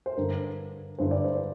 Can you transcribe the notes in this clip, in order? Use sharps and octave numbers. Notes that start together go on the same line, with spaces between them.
C5
G2 D3 A#4
G2 D3 C5
D5
C5